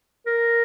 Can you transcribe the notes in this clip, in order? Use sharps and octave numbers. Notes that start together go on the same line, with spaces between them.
A#4